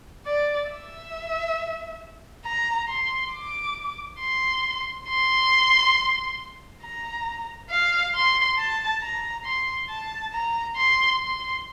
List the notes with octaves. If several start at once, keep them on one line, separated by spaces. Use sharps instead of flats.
D5
E5
A#5
C6
D6
C6
C6
A#5
F5
C6
A5
A#5
C6
A5
A#5
C6
C6